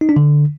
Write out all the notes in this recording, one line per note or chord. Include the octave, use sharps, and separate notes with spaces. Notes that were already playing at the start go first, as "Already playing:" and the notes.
D#4
D4
D3